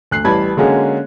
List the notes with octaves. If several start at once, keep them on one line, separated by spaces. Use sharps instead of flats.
D2 F#6 C7
A1 E3 G3 A5 B5 G#6
D3 G#3 A#3 C#4 F#4 G#4